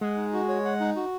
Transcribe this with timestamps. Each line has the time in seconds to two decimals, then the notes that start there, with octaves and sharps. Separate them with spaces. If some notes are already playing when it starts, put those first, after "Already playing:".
0.01 G#3 F#5
0.16 D#4
0.33 F#4
0.48 C#5
0.65 F#5
0.80 D#4
0.96 F#4